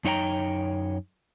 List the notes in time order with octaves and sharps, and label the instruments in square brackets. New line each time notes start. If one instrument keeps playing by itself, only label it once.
[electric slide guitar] F#2 D#4 C#5 G5 A#5